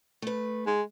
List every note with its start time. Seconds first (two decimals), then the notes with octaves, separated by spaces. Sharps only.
0.22 A3 B4
0.67 G#3